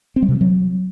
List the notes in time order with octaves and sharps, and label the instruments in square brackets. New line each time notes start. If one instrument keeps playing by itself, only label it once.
[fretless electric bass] C4
G3
C3
F3
F#3